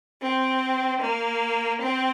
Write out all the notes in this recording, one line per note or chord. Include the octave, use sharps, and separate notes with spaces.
C4
A#3
C4